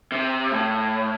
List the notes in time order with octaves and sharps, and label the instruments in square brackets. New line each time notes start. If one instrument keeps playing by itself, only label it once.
[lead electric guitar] C3
A2